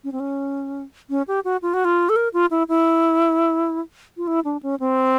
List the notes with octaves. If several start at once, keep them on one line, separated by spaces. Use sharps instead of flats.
C#4
C4
C#4
C#4
G4
F#4
F4
F#4
F4
A4
A#4
F4
E4
E4
F4
E4
D4
C#4
C4